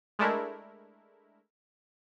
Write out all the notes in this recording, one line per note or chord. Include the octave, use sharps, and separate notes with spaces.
G#3 A3 D4 E4 A#4